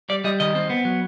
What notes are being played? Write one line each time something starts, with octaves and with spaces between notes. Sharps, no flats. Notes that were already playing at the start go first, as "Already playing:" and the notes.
G3 D5
G3 D#5
D#3 D#5
C4
B3
F#3